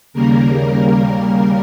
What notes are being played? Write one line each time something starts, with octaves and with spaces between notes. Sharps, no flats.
D#2 C#3 G3 A#3 A#4